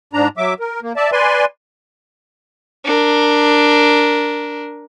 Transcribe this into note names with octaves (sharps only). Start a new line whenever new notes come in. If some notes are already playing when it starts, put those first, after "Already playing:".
G#2 D4 A#5
F#3 E5 D6
A#4
A#3
D5 E5 A5
B4 D5 G#5 C6
D4 A#4